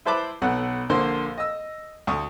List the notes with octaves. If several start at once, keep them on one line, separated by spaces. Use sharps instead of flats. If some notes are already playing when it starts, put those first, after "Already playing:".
E4 B4 C5 A5 B5 D6
B1 B3 A4 F#5 F#6
A#1 D3 A#3 C5 C6
D#5 E6
D2 C#6 D#6